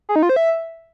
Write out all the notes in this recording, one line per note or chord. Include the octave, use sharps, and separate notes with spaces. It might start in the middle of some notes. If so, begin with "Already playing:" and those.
G#4
D#4
F4
C5
E5